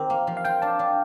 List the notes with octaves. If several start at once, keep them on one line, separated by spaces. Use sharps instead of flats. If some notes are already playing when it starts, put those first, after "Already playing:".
Already playing: D#3 C4 G4 A#4
A#3
F3
F5
F4 G5
D4 A5
D4